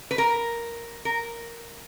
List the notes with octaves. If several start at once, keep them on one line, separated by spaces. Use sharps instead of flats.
B4
A#4
A#4